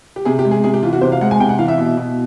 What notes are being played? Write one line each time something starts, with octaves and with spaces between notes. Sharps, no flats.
G4
C3 G#4
G4
G#3
G#4
C3 G#4
G4
E3 F4
F#4
C3 C5
F5
G#3 F#5
G#5
C3 G5
F#5
E3 F5
E5
B2
B2